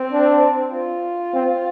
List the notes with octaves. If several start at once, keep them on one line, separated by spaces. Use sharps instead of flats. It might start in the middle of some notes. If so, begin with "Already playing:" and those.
Already playing: C4
D4
F4
C4